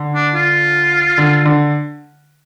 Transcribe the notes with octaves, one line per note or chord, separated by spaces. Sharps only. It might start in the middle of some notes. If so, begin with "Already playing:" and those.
Already playing: D3
D4
F4
D3
D3